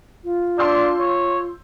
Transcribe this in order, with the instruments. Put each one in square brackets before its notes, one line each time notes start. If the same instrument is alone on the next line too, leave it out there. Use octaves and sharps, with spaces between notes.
[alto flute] F4
[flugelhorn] D4 [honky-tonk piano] C6 E6 G6
[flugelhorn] C#5